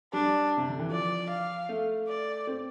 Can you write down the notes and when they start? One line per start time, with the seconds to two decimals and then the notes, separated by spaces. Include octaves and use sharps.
0.13 G3 D4
0.57 C3
0.69 D3
0.79 E3
0.91 F3 D5
1.30 F5
1.69 A3
2.08 D5
2.47 C4